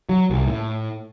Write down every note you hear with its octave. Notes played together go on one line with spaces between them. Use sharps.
F#3
C2
A2